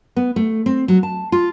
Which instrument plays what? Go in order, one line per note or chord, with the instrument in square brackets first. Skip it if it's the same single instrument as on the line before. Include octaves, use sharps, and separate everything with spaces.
[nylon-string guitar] B3
A3
C4
F#3
A5
F4